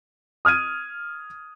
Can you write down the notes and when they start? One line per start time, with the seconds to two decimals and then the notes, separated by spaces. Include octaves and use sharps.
0.45 D#6 F6 G#6 D#7